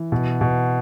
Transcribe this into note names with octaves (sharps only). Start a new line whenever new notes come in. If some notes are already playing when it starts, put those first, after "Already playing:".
Already playing: E3
B2
B2